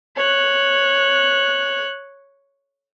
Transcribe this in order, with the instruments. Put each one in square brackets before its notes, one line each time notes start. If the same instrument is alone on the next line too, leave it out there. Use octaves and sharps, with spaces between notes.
[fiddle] C#5 F#6